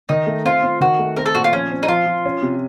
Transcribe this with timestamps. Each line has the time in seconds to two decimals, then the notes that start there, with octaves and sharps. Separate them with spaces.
0.09 D#3 D#4
0.27 A3
0.45 C4 F4
0.63 C4
0.81 D#3 F#4
0.99 A3
1.16 C4 A#4
1.26 A4
1.35 A#2 F#4
1.44 F4
1.52 F3 C#4
1.72 C4
1.83 D#4
1.88 F3 F4
2.06 F3
2.26 C#4
2.42 C3